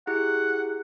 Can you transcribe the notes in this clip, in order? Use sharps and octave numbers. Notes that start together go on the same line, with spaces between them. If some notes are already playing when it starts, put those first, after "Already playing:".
E4 G4 G#4 F#5